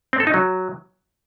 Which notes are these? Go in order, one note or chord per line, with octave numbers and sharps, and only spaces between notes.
C4
A4
D#4
F#3